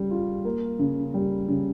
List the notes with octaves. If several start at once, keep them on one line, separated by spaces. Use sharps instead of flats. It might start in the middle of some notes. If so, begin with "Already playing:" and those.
Already playing: C#3 G3
F4
A#3
C#3
G3
C#3